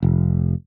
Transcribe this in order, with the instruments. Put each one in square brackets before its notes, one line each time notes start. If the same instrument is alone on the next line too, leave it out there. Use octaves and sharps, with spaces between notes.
[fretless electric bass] F1